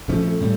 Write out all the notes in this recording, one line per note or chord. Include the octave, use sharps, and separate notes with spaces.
A#2 F3 A3 C#4
A3
A2 G3